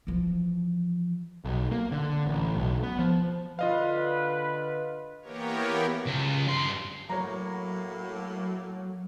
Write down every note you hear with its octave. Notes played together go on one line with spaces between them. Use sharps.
E3 F3
B1
A#3
D3
A1
B1
B3
F3
D3 F4 B4 D#5 F5
E3 A#3 B3 G4 A#4 C#5
C#2
G2 C6
A2 F#3 A#3 C#5 A#5